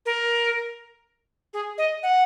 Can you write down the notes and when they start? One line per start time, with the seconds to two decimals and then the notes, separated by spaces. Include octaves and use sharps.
0.06 A#4
1.53 G#4
1.78 D#5
2.03 F#5